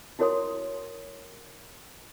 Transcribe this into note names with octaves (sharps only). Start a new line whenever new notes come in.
E4 F#4 A#4 C#5 C6 D#6